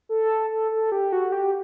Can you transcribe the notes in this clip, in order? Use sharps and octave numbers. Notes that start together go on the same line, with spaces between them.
A4
A4
A4
G4
F#4
G4